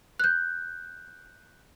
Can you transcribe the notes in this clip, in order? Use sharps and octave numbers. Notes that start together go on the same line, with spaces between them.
F#6 G6